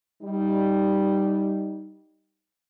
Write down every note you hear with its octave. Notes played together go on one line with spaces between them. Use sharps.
G3 D#4